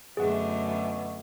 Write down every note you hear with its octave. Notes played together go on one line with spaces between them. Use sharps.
F#2 B2 D3 A3 G#4 F#5